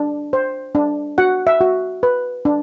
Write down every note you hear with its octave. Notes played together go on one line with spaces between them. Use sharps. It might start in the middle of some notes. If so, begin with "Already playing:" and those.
Already playing: D4
C5
D4
F#4 F#5
E5
F#4
B4
D4